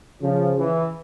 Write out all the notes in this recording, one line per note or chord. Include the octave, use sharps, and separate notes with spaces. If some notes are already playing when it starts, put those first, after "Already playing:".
C#3 F3
E3